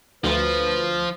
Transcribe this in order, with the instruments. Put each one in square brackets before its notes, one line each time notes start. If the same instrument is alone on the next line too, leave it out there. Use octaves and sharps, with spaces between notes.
[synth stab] D2 [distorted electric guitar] F3 [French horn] B4